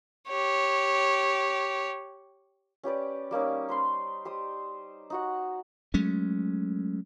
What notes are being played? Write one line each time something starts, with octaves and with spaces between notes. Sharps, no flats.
G4 C#5
C#4 G4 B4 D5
G3 A#3 C#4 D#4
C5 B5 C6
G4 C5 D#6
D#4 F#4 F#5
F#3 G#3 A3 C#4